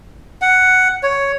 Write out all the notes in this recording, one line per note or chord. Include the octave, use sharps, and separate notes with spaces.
F#5
C#5